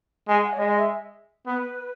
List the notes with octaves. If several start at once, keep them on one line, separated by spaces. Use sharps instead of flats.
G#3 G#5
F#5
C#5
G#3 D#5
D#5
E5
B3 B4